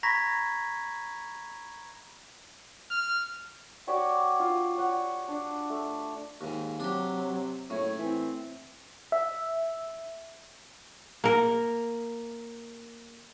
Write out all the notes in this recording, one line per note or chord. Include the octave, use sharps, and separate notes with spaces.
A#5 B5 C#6 G#6 A#6 B6
F6
F#4 G4 C#5 D5
F4
C#5 F#5
D4
A3
D#2 G#2
C3 F#3 D4 G4
F#1 A2 C#5
E3 C4
E5
A#3 A#4